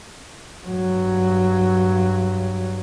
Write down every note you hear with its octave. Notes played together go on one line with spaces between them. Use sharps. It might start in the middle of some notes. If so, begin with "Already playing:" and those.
G2 F#3